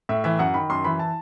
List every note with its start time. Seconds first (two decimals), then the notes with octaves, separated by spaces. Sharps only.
0.09 A2 E5
0.24 E3 E5
0.39 F#2 F#5
0.54 D#3 B5
0.70 F#2 C6
0.84 E3 B5
0.99 A5